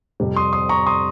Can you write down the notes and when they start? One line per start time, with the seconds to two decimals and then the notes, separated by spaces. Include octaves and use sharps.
0.20 F2 C3 G3
0.36 C6 D#6
0.53 C6 D#6
0.69 A#5 C#6
0.86 C6 D#6